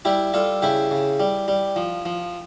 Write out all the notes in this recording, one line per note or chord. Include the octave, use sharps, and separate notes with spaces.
G3 E4 G4
G3 F4 A4
C#3 E4 G4
C#3
G3
G3
F3
F3